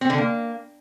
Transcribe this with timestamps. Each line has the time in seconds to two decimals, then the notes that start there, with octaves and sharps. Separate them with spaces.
0.01 C4
0.10 D3
0.18 A#3